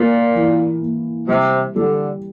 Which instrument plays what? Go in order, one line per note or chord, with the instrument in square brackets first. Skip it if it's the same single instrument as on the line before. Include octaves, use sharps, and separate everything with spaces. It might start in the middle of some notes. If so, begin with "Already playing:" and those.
Already playing: [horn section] A#2 [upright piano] A#3
[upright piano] E3
A#3
[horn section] C3 [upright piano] G3
[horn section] D3 [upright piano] G3